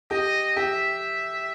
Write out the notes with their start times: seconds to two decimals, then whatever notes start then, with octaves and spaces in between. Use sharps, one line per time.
0.11 G4 D#5 G5
0.56 G4 E5 G5